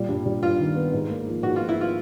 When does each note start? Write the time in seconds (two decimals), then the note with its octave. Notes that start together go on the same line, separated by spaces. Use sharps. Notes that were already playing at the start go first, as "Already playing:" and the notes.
Already playing: A#2 G3
0.09 G2
0.25 G2
0.42 G2 F4
0.59 D#3
0.75 B3
0.93 G#2
1.10 A#3
1.27 F3
1.43 G#2 F#4
1.56 F4
1.60 F3
1.69 E4
1.81 F4